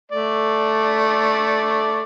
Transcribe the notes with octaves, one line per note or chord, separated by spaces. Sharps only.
A3 D5